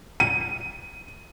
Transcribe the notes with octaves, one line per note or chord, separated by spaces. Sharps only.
D#7